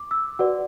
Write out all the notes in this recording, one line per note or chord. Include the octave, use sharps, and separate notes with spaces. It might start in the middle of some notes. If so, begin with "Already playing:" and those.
Already playing: D6
E6
F#4 B4 D5 F#5